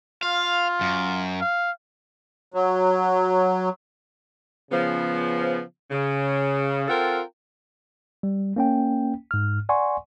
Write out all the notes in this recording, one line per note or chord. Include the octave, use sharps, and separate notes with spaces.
F4 F5
F#2
F5
F#3
C#3 F3 B3
C#3
C4 F4 A4 A#4 F#5 G5
G3
A#3 C#4 G5
G#2 F6
D5 F#5 G#5 C6 C#6